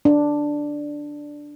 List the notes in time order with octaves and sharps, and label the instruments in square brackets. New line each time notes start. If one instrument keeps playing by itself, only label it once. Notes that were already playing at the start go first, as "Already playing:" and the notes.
[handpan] D4